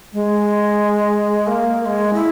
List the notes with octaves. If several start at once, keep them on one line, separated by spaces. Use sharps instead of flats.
G#3
A#3
A#3
G#3
E4